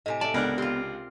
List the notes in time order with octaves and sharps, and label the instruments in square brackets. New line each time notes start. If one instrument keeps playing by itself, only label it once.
[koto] A2 C3 [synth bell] D#5 G#5
[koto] D5 [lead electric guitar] E5 A5
[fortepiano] C#2 D4 F#6 [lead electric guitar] B3 [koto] A#4
[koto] C4 F4 [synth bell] G4